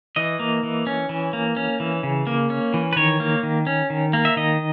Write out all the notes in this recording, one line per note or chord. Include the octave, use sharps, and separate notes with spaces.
E3 D#5
A#3
E3
C#4
E3
A#3
C#4
E3
C#3
A#3
C#4
E3
B4
D#3 C#5
A#3
D#3
C#4
D#3
A#3
E5
D#3 D#5